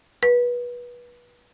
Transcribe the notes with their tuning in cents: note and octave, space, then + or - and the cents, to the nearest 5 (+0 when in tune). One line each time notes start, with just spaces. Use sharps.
B4 -25